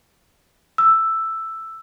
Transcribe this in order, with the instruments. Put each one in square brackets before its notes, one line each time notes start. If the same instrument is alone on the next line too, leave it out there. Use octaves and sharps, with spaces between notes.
[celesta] E6